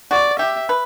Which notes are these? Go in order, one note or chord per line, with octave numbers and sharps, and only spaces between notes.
F#4 D5
G4 E5
B4